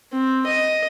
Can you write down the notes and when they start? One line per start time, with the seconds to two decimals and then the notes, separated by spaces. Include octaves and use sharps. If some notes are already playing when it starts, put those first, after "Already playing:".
0.13 C4
0.46 D#5